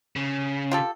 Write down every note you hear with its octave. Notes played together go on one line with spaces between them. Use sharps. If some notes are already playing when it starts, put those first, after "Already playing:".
C#3
F4 G4 A4